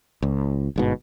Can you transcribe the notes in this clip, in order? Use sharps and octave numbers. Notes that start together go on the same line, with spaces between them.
C#2
G1 G#2 B2